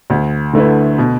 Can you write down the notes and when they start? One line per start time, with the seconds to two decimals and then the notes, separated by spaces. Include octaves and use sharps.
0.10 D2
0.53 D3 A3 E4 B4
0.98 B2